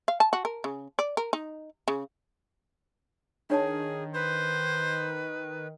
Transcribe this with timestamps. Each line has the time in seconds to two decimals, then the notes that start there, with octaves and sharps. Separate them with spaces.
0.08 F5
0.20 A5
0.33 F#4
0.45 A#4
0.64 C#3
0.99 D5
1.17 A#4
1.33 D#4
1.88 C#3
3.50 D#3 D4 G#4 C#5 A5
4.14 B4 C5